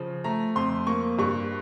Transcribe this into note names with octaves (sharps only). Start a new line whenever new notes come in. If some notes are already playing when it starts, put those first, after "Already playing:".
Already playing: C#3 F3
A3 A#5
F2 C6
A#3 C#6
G2 C#6